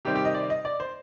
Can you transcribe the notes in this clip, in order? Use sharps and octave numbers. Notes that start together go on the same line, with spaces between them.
C3 D#3 G3 C4 G4
G4
D#5
D5
D#5
D5
C5